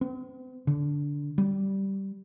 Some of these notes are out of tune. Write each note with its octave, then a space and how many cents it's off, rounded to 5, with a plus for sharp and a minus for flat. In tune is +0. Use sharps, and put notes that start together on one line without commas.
C4 -45
D3 -15
G3 -10